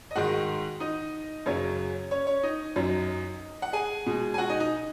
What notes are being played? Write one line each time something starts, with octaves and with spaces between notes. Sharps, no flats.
D#5
G#2 D#3 G#3 F#4 F#5
D#4 D#5
F#2 C#3 F#3 C#4 C#5
C#4 C#5
C#4 C#5
D#4 D#5
F#2 F#3
F#5
G#4 G#5
B2 G#3
G#5
F#4 F#5
D#4 D#5
D#4